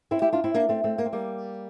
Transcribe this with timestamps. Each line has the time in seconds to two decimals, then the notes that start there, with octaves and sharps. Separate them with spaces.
0.11 C4 E4
0.22 E4 G4
0.32 D4 F4
0.44 C4 E4
0.54 A#3 D4
0.69 A3 C4
0.84 A3 C4
0.98 A#3
1.06 C4
1.13 G3 A#3